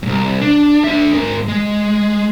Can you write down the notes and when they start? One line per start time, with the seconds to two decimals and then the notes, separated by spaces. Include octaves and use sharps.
0.03 C2 G2
0.41 D4
0.84 D4 E5
1.14 G#2 A#4
1.48 G#3